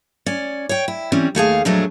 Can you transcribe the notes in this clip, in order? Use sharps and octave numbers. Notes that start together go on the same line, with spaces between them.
C#4 D5
C#5 G5
E4
E3 G3 C4 C#4
D#2 A3 G#4 F5
F2 A#2 F#3 G#3 A3 D4